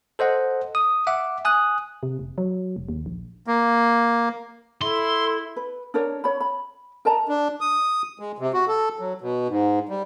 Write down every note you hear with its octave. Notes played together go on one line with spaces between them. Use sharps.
A4 C5 D#5 F#5
D#6
E5 F#5 D6
G#5 D#6 F#6
C3
F1
F#3
F1
D#2
A#1
A#3
E4 A4 C6
B4
D4 A#4 C#5
C#5 B5
B5
A#4 D#5 A5 A#5
D4
D#6
G#3
C3
F#4
A4
F#3
B2
G#2
G3